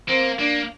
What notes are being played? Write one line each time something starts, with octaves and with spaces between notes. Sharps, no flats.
A#3 C4
A#3 D4